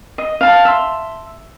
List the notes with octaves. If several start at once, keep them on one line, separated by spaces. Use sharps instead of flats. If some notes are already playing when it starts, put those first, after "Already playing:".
D#5
F5 A5
E5 C6